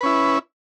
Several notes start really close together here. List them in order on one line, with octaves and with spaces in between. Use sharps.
B4 C#4 E4